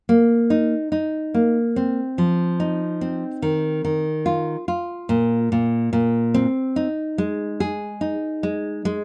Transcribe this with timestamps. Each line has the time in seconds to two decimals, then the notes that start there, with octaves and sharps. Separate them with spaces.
0.09 A#3
0.50 D#4
0.92 D#4
1.34 A#3
1.76 C4
2.18 F3
2.60 D#4
3.01 C4
3.42 D#3
3.84 D#3
4.26 F4
4.68 F4
5.09 A#2
5.52 A#2
5.93 A#2
6.34 C4
6.76 D#4
7.18 G#3
7.60 G#4
8.01 D#4
8.43 G#3
8.85 G#3